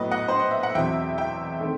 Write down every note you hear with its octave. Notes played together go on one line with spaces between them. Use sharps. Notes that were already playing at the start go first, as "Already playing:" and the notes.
Already playing: A2 F#3 B3 B4 D#5
D#5 F#5
C5
D#5
E5
F#5
E2 B2 F#3 C4 E5 G5
E5 G5
D#3 A3 C4